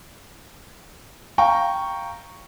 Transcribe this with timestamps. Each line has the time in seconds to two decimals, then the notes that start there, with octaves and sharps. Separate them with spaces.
1.38 F5 G5 A#5 C#6